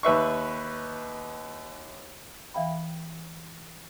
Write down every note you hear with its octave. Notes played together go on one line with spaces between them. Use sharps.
D#2 B4 E5 C#6
E3 E5 F5 G5 B5